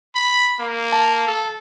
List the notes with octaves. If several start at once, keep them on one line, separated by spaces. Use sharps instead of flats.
B5
A#3
A5
A4